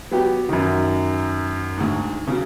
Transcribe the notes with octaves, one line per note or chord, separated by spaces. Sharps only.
F#3 B3 G4
F#2 D#3
D2 G#2
C#3 F#3